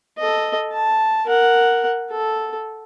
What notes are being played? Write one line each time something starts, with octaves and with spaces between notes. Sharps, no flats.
A4 D#5
A5
A#4 F#5
A4